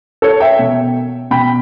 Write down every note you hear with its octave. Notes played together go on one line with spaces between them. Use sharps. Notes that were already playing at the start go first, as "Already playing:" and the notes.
A4 C#5
E5 G5
B2
B2 G5 B5